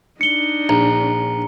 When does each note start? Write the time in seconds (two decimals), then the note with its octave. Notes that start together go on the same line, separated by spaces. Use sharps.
0.21 D4 D#4 C#7 G7
0.69 A#1 A#5